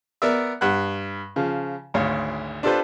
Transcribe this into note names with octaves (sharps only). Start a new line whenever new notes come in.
B3 A#4 D5 E5
G2 F#5 F#6
C#3 F3
G#1 D2 C#5 F5
D4 F4 G4 A4 B4 C5